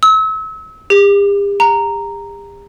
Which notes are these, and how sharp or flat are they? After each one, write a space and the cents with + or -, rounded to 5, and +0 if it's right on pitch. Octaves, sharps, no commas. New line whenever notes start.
E6 -35
G4 +45
A#5 -5